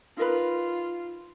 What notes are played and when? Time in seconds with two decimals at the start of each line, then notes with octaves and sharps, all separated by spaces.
0.17 D#4 F4 A#4 B4